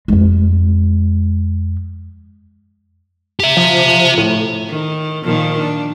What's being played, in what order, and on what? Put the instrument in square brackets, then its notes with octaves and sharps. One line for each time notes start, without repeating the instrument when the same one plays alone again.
[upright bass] F2 G#3
[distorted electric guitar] G4 E5
[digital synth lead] F3
A2
[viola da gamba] D#3
A#2 D#3 F3
D4